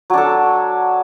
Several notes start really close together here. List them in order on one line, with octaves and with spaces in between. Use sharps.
F#3 D4 A4